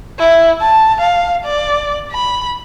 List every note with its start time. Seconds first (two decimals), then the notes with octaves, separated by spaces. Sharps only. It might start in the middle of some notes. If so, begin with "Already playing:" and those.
0.19 E4
0.61 A5
1.00 F5
1.45 D5
2.11 B5